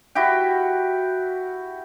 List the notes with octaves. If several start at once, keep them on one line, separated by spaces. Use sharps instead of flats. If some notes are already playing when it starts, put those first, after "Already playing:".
E4 F#4 G4 G5